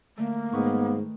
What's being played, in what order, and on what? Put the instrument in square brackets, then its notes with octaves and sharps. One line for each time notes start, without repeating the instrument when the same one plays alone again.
[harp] D3 A3 [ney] A#3
[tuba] G#2 [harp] D#3 B4 C#6 [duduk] B3